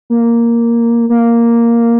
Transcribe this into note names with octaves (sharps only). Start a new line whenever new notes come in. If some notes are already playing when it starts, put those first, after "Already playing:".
A#3
A#3